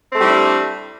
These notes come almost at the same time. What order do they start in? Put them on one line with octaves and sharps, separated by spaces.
C4 A3 G3 E4 D4